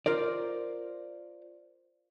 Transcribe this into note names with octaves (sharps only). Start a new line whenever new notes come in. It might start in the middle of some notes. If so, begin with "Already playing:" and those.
F4 A#4 C5 D5